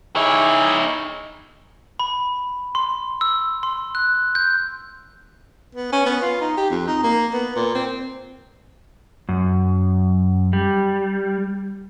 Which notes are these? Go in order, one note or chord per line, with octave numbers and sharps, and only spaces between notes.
D#4 E4 G#4 C#5 E5
B5
C6
E6
C6
F#6
G6
B3
C#4
B3
F4
D#4
G4
F2
D#4
A#3
B3
A#2
C4
F#2
G3